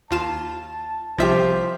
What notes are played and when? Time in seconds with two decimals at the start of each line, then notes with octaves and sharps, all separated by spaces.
0.11 D#2 F4 A5 E7
1.18 C2 F3 G4 C5 E5 B6